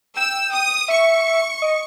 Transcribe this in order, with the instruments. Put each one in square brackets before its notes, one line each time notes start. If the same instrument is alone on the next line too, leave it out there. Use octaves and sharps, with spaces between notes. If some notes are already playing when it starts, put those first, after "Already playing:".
[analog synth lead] G5 [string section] E6
[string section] D#6
[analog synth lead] E5 [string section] C#6
[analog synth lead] D#5